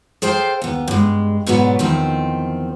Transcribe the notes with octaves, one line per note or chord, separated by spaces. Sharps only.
G#4 A4 C5 F5 G5
D#2 B3
G2 G#3
G#2 B2 F#3 B3 D5
E2 D#3 F3 C4